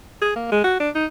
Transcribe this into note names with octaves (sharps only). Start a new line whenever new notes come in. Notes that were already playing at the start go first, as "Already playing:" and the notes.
G#4
A#3
G#3
F#4
D4
D#4